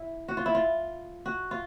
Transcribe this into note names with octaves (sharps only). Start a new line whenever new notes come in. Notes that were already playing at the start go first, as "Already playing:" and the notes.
Already playing: E4
F#4
F4
E4
F4
F#4
F4